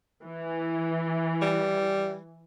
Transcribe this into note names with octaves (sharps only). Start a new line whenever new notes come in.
E3
G3